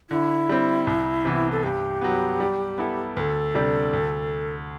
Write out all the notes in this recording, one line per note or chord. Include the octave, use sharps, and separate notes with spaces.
D3 E4
G3 C4
C2
C3 E3 B3
A4
G2 G4
F#3 B3
G3
B3 E4 A4
D2 A4 B4
C3 G3 D4
D2